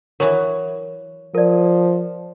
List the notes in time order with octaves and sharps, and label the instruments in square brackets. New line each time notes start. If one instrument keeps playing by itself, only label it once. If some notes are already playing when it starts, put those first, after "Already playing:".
[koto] E3 F#3 [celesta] A#4
[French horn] F3 [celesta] A#4 D5